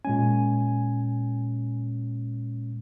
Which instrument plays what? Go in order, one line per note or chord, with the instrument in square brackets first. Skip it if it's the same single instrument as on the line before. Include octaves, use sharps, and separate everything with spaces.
[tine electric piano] A#2 G#3 C#4 G#5